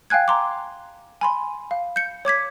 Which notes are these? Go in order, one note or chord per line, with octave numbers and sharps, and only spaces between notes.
F5 G5 G#5 F#6 G#6
A#5 C6 D6
G#5 B5 C6
F5
G6 C#7
C#5 D6 G#6 B6